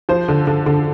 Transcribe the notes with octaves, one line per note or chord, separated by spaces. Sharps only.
F3 C5
D3
D3
D3